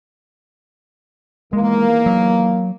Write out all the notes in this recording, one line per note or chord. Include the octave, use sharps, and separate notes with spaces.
E2 D#3 G#3 A#3
F#3